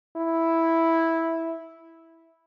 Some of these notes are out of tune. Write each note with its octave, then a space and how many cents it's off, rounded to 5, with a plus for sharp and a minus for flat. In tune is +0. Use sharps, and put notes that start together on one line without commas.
E4 -5